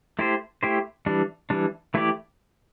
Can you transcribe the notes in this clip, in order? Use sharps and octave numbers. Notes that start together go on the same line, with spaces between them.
A3 E4 G4 C5
A3 E4 G4 C5
E3 G3 D4
E3 G3 D4
E3 A3 E4 G4 D5